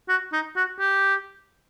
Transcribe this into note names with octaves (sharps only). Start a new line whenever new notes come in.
F#4
D#4
F#4
G4